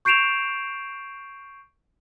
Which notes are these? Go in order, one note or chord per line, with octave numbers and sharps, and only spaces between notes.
C#6 G6 C7 D7 E7 F7